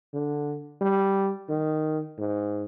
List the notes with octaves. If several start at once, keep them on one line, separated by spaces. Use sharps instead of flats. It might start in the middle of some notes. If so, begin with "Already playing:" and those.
D3
G3
D#3
G#2